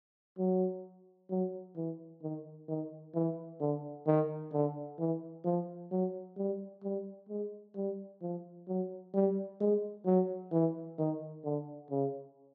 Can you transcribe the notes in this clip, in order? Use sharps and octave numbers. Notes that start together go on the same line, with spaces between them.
F#3
F#3
E3
D#3
D#3
E3
D3
D#3
D3
E3
F3
F#3
G3
G3
G#3
G3
F3
F#3
G3
G#3
F#3
E3
D#3
D3
C#3